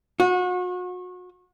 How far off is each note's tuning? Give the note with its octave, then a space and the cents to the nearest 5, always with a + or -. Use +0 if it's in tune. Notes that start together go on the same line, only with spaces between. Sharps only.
F#4 -35